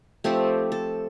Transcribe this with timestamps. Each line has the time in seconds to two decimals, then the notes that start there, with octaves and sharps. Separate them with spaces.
0.24 F3 A3 C4 G4
0.72 A4